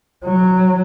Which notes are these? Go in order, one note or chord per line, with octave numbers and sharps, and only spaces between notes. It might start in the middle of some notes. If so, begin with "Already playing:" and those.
F#3